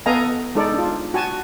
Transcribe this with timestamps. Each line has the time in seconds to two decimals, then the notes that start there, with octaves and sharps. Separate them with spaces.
0.06 B3 A4 D#5 F5 G#5 A#5
0.55 G#3 D#4 A4 D5
0.74 D4 F4
1.14 F#4 G#5 A5